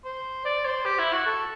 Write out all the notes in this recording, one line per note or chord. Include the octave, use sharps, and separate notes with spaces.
C5
D5
C5
G4
E4
F#4
A4